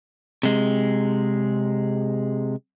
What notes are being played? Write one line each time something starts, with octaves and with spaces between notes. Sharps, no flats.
C3 G#3